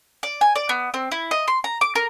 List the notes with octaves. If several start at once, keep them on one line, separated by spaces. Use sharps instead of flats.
D5
G#5
D5
B3
C4
E4
D#5
C6
A#5
D6
A#4